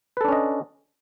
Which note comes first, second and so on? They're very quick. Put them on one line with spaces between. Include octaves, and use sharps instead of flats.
B4 A4 D4 C#4 D#5